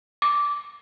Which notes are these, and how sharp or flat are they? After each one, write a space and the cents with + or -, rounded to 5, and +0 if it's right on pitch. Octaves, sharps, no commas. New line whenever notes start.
D6 -10